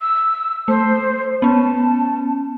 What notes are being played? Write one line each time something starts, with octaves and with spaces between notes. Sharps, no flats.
E6
A3 C5
B3 C#4 A5